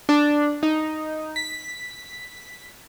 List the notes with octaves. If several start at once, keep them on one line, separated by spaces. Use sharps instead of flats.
D4
D#4
B6